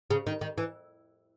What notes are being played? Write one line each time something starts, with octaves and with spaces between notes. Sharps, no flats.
C#3
D#3
D#3
E3